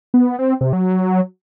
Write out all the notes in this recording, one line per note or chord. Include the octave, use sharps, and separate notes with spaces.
B3
C4
C3
F#3